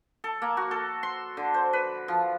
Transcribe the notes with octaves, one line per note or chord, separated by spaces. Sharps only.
A4
A#3
F#4
A4
C6
D3
C5
B4
F3